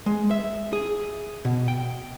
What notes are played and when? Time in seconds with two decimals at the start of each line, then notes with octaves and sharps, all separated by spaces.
0.06 G#3
0.31 E5
0.73 G#4
1.45 B2
1.68 G5